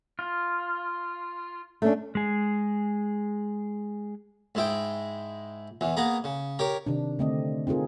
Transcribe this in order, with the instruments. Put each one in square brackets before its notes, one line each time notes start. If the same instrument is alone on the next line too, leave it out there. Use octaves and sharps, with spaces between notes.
[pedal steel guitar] F4
[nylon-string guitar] A3 C#4 D4
[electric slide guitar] G#3 G#4
[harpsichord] G#2 G#3 E4 G5
E2 E3
A#3 B3 G#4 A#5
C#3
G4 A#4 C#5
[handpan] C3 D#3 D4
D3 A3 C4 D5 D#5
C4 D#4 F4 G#4 A#4